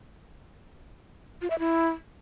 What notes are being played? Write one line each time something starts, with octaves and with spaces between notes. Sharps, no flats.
F4
E5
E4